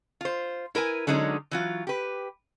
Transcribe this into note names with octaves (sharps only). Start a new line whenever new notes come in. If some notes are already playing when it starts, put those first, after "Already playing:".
F4 C5
E4 A#4 B4 G#5
D3 F#3 G#3 C#4 D#4
E3 F#3 F4
G4 B4